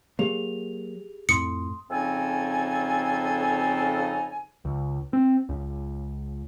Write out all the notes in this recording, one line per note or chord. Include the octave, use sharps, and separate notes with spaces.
F#3 A#3 G4 G#4 F7
F2 A2 C6 D#6 C#7
F2 C#3 C4 D#4 A4 G#5
C#2
C4
C#2